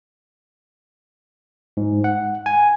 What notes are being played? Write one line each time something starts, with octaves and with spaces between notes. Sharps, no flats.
G#2
F#5
G#5